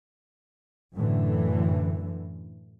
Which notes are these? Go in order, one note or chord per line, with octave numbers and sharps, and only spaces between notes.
F#2 A2 D3 E3